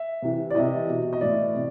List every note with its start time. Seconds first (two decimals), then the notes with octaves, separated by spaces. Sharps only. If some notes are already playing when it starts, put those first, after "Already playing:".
Already playing: E5
0.22 C3 E3
0.50 D5
0.55 C3 E3 D#5
0.88 B2
1.13 D#5
1.21 A2 E3 D5
1.54 C3